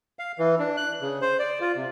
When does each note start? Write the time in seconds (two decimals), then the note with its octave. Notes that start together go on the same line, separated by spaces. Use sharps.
0.19 F5
0.39 E3
0.59 D4
0.77 F#6
1.01 C#3
1.21 C5
1.39 D5
1.61 F4
1.76 C3